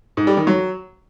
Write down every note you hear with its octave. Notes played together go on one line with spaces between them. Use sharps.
G#2
G3
D#3
F#3